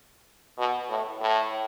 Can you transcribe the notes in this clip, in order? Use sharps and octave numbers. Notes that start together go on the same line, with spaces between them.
B2
A2
A2